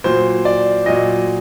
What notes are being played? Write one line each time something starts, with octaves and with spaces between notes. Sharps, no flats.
A#2 F#3 C5
D5
A#2 F#3 D#5